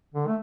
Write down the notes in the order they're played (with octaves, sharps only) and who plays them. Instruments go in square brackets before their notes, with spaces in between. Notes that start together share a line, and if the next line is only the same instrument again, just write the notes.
[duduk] D3
A3